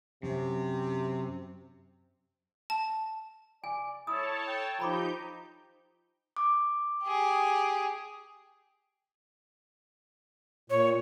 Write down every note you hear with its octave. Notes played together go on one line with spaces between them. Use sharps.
F#2 C3
A5
D5 G#5
E4 A4 C#5 A5 D#6
G5
F3 D#4 G4 A#5 B5 D6 G6
D6
G4 G#4
A#2 C#5